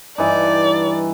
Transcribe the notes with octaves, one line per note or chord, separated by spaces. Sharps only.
G2 E3 D#4 D5